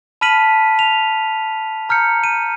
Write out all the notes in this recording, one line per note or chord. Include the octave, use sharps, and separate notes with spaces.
A5 B5 F6 B6 D#7 F#7
F7
A#5 F6 G6 C#7
D#7